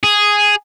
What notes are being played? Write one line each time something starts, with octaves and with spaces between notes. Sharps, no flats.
G#4